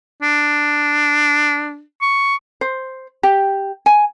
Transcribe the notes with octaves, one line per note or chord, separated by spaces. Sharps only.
D4
C#6
C5
G4
G#5